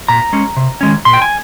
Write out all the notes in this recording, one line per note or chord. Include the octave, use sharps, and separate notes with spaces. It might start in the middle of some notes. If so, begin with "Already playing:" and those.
A#2 A#5
G#3 C#4
C3
D#3 G#3 C#4
A#2 C6
G5
G#5